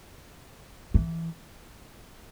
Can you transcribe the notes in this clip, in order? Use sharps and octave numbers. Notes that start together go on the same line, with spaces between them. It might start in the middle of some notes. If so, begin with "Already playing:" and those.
E3